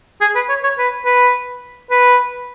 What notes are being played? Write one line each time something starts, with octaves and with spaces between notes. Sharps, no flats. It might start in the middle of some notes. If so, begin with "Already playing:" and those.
G#4
B4
C#5
C#5
B4
B4
B4